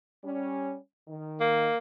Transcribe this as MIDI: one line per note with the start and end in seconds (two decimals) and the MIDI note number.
0.25 0.75 55
0.25 0.75 61
1.08 1.66 51
1.40 1.77 58